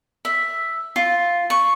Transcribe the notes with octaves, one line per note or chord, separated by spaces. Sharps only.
E5
F4
C#6